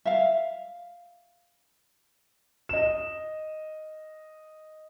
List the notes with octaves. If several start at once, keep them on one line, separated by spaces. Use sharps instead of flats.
E5 F5
D#5 E7